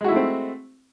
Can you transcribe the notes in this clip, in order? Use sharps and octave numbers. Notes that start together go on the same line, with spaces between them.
G#3 A3 C4 E4 F#4